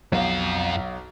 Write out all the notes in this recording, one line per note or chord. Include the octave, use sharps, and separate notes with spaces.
B1 F2 F5